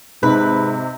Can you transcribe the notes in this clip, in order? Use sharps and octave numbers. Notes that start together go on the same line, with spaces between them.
G#2 C3 D#4 B4